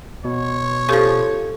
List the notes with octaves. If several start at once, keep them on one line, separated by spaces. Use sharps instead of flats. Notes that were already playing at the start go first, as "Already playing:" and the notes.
B2 C#5
C#3 F3 G4 A4 C#6